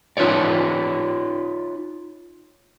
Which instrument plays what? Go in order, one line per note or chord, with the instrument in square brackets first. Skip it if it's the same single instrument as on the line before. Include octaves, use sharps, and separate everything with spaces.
[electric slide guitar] D#4 F4 B4 C#5 D5